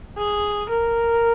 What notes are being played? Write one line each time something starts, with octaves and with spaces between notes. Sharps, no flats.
G#4
A#4